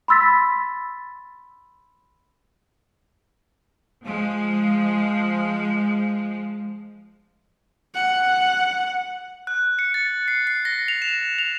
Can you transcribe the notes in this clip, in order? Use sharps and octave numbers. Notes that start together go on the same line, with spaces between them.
B5 C6 E6 A6 B6
F3 G#3
F#5
F#6
C#7
A6
C7
C7
A#6
F7
E7
F7